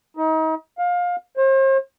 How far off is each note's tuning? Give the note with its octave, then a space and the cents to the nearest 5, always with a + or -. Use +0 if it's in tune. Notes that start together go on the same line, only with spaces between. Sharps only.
D#4 +35
F5 +25
C5 +40